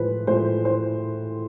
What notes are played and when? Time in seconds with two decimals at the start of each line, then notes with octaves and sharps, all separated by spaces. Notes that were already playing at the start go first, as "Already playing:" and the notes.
Already playing: A2 F3 G#3 B4 C5
0.27 A2 F3 G#3 C5
0.65 C5